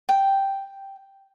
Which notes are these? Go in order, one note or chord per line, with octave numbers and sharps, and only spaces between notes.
G5